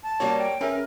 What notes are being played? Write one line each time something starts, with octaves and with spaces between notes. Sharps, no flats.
A5
G3 A#3 F#4 C#5
G5
C#4 G#4 A#4 B4 E5